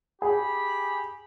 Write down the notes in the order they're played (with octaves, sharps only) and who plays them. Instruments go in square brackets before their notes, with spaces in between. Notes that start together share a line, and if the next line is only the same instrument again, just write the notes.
[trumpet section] G4 B5 [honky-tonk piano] G#4